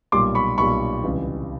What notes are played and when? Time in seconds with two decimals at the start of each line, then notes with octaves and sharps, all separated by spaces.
0.12 B1 A#2 G3 C6 D6
0.35 B5 C#6
0.58 B1 A#2 G3 B5 C#6
1.04 C#2 C3 E3 G3